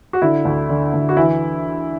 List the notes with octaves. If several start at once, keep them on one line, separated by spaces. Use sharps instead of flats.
F#4
D3 E4
D2
D3
D2
F#4
E3 E4